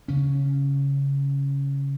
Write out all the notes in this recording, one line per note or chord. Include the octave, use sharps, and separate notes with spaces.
C#3 C#4